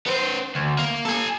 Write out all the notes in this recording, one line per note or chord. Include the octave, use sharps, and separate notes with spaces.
B3 C5
D2
A#3
A4 G#5